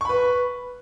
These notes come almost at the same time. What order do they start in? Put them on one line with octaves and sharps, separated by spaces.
C#6 B5 B4